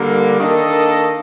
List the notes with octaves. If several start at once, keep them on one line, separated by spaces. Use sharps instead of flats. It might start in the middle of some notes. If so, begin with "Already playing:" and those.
Already playing: D3 G3 A#3
D#3 A#3 D4 A4 D#5